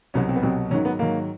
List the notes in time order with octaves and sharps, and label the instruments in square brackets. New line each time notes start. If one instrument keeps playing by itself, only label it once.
[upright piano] C2 B2 F#3 C#4
C4
B3
C2 B2 F#3 C4
G#2 D#3 F#3 C#4
B3
G#2 D#3 F#3 A#3